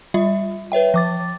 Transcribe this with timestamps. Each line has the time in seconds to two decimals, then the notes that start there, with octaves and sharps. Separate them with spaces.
0.14 G3 F4 E5
0.72 B4 C#5 E5 G5
0.94 F3 D6 A6